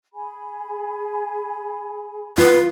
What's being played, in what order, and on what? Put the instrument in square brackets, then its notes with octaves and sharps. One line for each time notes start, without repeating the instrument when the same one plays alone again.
[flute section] G#4 G#5 B5
[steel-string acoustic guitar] F4 [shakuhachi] B4